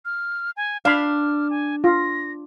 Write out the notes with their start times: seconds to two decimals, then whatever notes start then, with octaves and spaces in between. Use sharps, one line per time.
0.05 F6
0.57 G#5
0.85 D4 F5 B5 F6
1.50 G#5
1.84 F4 A#6